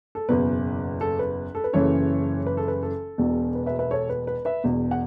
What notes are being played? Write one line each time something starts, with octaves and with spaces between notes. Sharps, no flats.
A4
F#1 E2 B2 B4
A4
B4
A4
B4
F#1 F#2 C#3 E3 A4 C#5
B4
A4
B4
A4
E1 E2 B2
B4
B4 E5
B4 E5
A4 C#5
B4
B4
B4 E5
E1 E2 B2
F#5